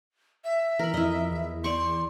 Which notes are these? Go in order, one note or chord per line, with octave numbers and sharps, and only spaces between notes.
E5
E3 A#4 B5
F2 E4 D#5
E2
D5 C6 C#6